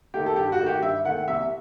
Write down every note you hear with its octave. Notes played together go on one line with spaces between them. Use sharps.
D#3 A3 G4
A4
G2 G4
F#4
D#3 A3
G4
G2 E5
D#3 A3 F#5
C2 E5